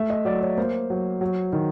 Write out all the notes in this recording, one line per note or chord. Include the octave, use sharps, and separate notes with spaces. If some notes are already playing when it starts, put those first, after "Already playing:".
Already playing: A3 E5
D#5
F#3 D5
C#5
A#3 C5
F#3
F#3
D#3